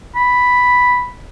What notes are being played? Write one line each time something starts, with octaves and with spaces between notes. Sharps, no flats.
B5